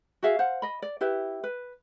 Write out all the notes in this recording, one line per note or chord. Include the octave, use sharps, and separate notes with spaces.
F#4 G#4 E5 F5
C5 F5 F#5
D#5 B5
D5
E4 G4 B4 E5
B4